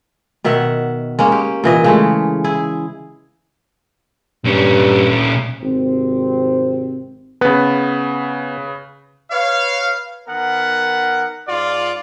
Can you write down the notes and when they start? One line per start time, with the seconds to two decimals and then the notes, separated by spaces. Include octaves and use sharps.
0.44 B2 D#3 E5 F#5
1.19 G#3 A#3 C#4
1.32 G4
1.64 A#2 E3 D#5
1.84 C#3 G#3 A3
2.44 E4 G#4
4.45 G2 A#2 C#4
5.61 G#1 C3 C4
7.41 C#3 B3 B4
9.31 B4 C#5 F5
10.28 D#3 B3 A#4 F#5
11.47 G#2 F4 D5